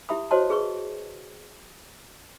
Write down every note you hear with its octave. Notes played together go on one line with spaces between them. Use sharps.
E4 G4 E5 B5 D#6
F#4 C5 C#5 D#5 A5 C6
G#4 B4 C#6